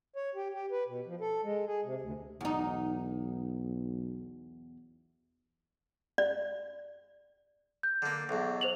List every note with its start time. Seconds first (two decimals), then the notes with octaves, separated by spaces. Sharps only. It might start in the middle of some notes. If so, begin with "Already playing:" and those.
0.16 C#5
0.35 G4
0.53 G4
0.72 B4
0.87 B2
1.06 F3
1.20 A4
1.43 G#3
1.66 G#4
1.84 C3
2.01 D2
2.41 B1 E2 D#4
6.18 D5
7.83 G6
8.02 D3 A#3
8.29 B1 E2
8.61 C5 F7 F#7